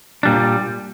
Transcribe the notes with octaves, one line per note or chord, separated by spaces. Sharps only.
A#2 G3 D4